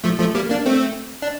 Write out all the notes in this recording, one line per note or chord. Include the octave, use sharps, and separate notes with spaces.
F3 A3
F3 A3
G3 A#3
A#3 D4
A3 C4
D4